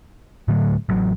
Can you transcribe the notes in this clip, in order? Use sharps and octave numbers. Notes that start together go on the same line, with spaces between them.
A2 D3 F#3 A3
A1 F#3